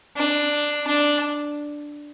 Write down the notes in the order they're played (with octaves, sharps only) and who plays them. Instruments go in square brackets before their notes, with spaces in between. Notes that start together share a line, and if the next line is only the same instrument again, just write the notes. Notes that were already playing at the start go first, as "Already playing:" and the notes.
[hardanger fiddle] D4
D4